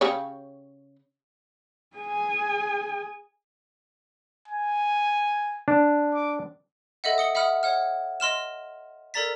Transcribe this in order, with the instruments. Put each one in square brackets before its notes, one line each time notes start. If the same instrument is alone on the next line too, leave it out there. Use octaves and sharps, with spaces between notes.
[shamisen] C#3 G4 C#5
[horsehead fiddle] G#4 G#5
[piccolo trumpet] G#5
[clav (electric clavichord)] D4
[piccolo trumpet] D6
[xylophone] A4 D#5 E5 F#5
D#6 C#7 G7
E5 F#5 B5 D#6 F6
C#5 F#5 F6
D#5 C6 F6 E7
A4 A#4 D5 A#5 A6 B6